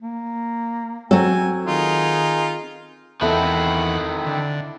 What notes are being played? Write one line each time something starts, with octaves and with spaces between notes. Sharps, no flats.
A#3
F#3 C4 A4 G#5
D#3 D#4 F4 G#4
E2 D#3 C4 E4 A4 D#5 F#5
D3